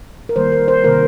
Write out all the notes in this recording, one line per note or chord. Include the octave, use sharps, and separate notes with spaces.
A#4
D#3 G3 A#3 C5
A#4
C5
C3 D#3 A#3 A#4